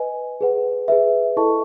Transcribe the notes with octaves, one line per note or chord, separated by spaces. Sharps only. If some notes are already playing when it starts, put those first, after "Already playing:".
Already playing: B4 D#5 G#5
G#4 B4 F#5
G#4 B4 E5
E4 A4 D#5 A5 C#6